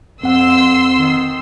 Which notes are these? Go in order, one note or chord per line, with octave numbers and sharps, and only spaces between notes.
F2 C4 F#5 C6 E6
D#3